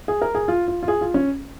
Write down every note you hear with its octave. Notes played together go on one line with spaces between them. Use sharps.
G#4
A#4
G#4
F4
F4
F4
G#4
F4
C#4